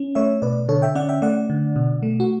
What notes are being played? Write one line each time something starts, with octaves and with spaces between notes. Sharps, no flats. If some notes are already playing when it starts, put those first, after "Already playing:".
Already playing: C#4
A3 C#5 E5
B2 B4 D5
D3 A4 C#5
E5 G5
C#4 D5 F#5
E5 G5
A3 D5 F#5
D3
B2
A3
F#4